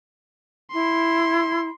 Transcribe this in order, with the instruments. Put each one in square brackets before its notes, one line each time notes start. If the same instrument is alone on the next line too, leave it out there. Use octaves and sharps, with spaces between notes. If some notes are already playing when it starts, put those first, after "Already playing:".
[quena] E4 [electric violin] C6